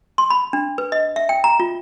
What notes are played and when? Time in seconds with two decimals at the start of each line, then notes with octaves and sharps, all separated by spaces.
0.18 C6
0.30 B5
0.53 D4
0.78 B4
0.92 D#5
1.16 E5
1.29 G5
1.44 A#5
1.60 F4